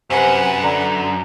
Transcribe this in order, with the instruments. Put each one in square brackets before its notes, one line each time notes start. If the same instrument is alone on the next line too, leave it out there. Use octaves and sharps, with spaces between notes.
[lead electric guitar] F#2 [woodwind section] C3 [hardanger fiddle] B4 F#5 [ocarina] G#5
[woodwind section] D3 [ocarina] A#5